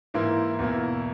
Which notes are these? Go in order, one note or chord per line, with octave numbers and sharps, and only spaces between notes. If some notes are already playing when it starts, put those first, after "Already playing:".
G#2 E3 A#3 E4
E2 B2 A#3 E4